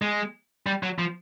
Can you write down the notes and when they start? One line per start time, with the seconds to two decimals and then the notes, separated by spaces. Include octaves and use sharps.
0.02 G#3
0.67 G3
0.83 F#3
0.99 F3